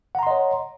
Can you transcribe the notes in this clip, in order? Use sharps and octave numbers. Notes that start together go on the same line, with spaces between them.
C#5 D#5 F#5 A#5 C6